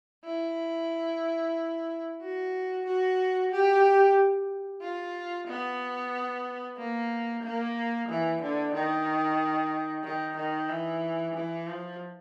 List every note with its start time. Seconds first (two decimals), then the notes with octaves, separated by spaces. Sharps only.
0.25 E4
2.22 F#4
2.86 F#4
3.51 G4
4.82 F4
5.47 B3
6.78 A#3
7.43 A#3
8.08 E3
8.41 D3
8.74 D#3
10.04 D#3
10.36 D#3
10.69 E3
11.34 E3
11.67 F3